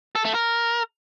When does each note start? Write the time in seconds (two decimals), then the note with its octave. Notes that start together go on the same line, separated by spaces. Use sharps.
0.15 A4
0.25 A3
0.34 A#4